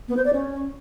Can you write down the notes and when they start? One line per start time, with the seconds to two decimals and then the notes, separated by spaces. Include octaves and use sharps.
0.08 B3
0.17 C5
0.25 D5
0.33 C#4